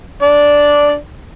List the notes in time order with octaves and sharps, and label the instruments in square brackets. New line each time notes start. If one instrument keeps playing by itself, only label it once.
[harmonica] D4 D5